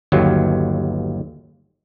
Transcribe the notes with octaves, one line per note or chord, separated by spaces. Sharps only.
G1 D#2 F#3